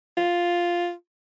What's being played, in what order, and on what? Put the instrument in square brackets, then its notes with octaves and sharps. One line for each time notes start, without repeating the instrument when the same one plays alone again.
[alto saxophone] F4